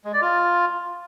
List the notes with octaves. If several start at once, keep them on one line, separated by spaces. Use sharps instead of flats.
G#3
D5
F4